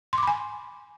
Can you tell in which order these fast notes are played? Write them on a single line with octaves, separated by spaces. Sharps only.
C6 D6 B5 G#5